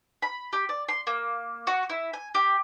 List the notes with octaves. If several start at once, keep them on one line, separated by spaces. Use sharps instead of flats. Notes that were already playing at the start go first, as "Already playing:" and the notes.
B5
G4
D5
C6
A#3
F#4
E4
G#5
G4